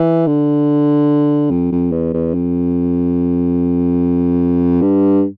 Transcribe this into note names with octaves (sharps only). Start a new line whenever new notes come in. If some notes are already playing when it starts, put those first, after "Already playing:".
Already playing: E3
D3
F2
F2
E2
E2
F2
G2